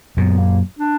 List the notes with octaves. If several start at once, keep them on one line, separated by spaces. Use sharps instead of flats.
F#2 A#2 B3
A#3
D4